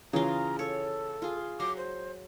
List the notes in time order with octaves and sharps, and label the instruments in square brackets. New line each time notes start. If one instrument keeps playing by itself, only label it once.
[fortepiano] C#3 E3 [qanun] F4 G#4 [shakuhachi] A#5
[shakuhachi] A4 [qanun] C#5
[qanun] F4 G#4
[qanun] F#3 A#5 C6 [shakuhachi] D6
[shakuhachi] C5